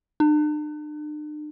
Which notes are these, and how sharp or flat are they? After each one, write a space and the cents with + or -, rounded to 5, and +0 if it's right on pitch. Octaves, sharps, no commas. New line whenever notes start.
D4 +45